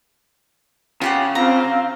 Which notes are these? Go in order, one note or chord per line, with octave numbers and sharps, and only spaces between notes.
C#3 F4 G4 F#5
C4 F4 F5 A#5